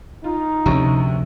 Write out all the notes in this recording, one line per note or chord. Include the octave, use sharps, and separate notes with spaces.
D#4 F4
F1 D2 C3 C#4 C#6